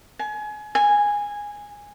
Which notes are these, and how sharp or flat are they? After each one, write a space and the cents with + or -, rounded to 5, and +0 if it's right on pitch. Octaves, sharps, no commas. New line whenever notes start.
G#5 +30
G#5 -10